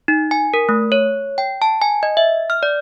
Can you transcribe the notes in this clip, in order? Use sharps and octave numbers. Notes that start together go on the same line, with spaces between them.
D#4
G#5
A#4
A3
C#5
G5
A5
G#5
D#5
E5
F6
D5